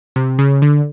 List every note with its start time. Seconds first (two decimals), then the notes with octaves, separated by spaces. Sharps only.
0.16 C3
0.39 C#3
0.62 D3